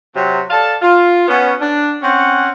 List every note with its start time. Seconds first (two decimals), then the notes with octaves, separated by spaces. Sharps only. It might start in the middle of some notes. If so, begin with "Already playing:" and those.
0.15 C3 F#3
0.50 A4 D5 F5 A5
0.82 F4
1.28 B3 C#4
1.61 D4
2.02 C4 C#4 F#5